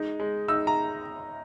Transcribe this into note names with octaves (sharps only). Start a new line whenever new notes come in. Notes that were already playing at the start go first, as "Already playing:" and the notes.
Already playing: G#3 D#4
G#3
D#4 E6
A#5